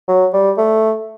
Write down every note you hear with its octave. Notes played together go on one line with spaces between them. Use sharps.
F#3
G3
A3